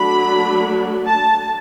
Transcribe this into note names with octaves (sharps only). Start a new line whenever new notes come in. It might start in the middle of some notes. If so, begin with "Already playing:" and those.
Already playing: F#3 A3 D4 B5
A5